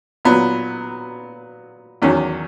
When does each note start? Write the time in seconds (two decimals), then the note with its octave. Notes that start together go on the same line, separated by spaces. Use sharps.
0.25 A#2 F#3 B3
2.02 E2 D#3 F#3 C#4